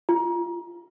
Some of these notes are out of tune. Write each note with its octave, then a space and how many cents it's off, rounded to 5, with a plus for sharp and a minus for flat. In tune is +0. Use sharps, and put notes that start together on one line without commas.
F4 -15